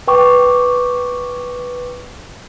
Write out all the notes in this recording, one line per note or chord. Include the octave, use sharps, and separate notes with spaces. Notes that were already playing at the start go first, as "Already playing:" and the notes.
B4 G5 C#6 D6